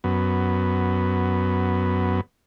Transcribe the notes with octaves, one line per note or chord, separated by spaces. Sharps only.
F#2 B3